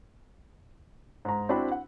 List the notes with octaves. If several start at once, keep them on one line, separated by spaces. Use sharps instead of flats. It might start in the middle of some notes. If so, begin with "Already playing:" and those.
G#2 A#5
C4 D4 E4 F#4 G5 B5
F#5